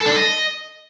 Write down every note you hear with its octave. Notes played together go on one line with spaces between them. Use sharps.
A4
D4
A4
D#5